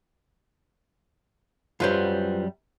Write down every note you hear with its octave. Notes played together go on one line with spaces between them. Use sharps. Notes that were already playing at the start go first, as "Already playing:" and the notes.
F#2 F#3 G3 F4 B4 C5